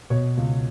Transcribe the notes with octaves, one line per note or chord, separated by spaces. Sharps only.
B2 C#5
C#2